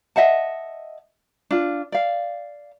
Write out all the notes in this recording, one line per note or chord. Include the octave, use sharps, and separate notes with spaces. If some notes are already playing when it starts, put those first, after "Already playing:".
D#5 E5 F#5 A5
D4 F4
D5 F5